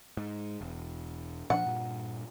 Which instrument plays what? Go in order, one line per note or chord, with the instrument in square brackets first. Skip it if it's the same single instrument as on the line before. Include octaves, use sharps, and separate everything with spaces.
[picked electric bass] G#2
E1
[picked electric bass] A#2 F3 D4 [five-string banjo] F#5
[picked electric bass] G2 A#2